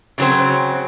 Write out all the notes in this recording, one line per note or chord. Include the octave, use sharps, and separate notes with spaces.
C#3 F#3 C4